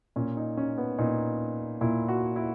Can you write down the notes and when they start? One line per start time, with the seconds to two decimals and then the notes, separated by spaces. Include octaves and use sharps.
0.16 A#2 C#4
0.37 D#4
0.57 C#4
0.78 B3
0.98 A#2 D#4
1.81 A#2 E4
2.08 F#4
2.36 E4